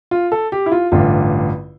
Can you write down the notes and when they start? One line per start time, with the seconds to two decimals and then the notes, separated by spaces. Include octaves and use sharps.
0.11 F4
0.32 A4
0.52 G4
0.66 E4
0.72 F4
0.92 A1 G2 D3 F4